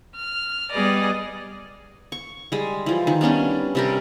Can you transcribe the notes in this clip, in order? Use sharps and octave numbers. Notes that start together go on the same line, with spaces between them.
F6
G3 B3 G#4 D5 D#5
C#6
G3 G#3
E3 F3
D#3
G3 B3 C#4 D4
C3 G3 A#4